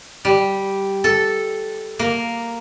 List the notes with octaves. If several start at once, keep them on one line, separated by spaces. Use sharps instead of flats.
G3
A4
A#3